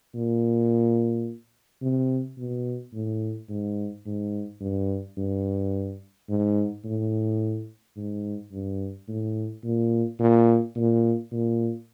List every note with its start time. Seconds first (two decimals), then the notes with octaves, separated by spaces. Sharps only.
0.14 A#2
1.82 C3
2.38 B2
2.94 A2
3.49 G#2
4.06 G#2
4.61 G2
5.17 G2
6.29 G#2
6.84 A2
7.97 G#2
8.52 G2
9.08 A2
9.64 A#2
10.20 A#2
10.76 A#2
11.32 A#2